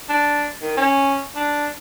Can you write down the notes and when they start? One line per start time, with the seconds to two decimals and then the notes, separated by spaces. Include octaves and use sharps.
0.09 D4
0.62 D#3
0.77 C#4
1.36 D4